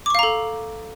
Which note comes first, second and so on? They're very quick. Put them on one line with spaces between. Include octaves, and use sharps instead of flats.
D6 C#6 F5 A#5 A4